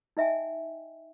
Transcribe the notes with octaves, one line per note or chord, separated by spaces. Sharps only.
D#4 D#5 E5 G5 G#5